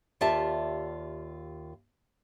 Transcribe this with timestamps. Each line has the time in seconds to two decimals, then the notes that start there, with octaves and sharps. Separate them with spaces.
0.21 D#2 F4 G4 D5 E5 A5